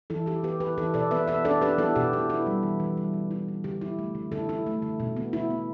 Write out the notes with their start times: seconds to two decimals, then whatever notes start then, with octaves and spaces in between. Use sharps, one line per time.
0.10 E3 E4 A4
0.26 E4 G4
0.43 B3 G4 B4
0.60 E4 G4 B4
0.78 E3 E4 A4
0.94 B2 A4 D5
1.11 B3 B4 E5
1.28 B3 B4 E5
1.45 D4 A4 D5
1.61 D4 G4 B4
1.78 B3 E4 A4
1.96 B2 G4
2.13 B3 E4
2.30 E4
2.47 G3
2.63 E3
2.80 E3
2.97 G3
3.14 E3
3.31 E4
3.48 E4
3.64 D3 G4
3.81 E4
3.99 A3
4.15 D3
4.32 D3 E4 A4
4.49 E4
4.66 A3
4.82 D3
5.00 B2
5.16 B3
5.33 E4
5.50 B3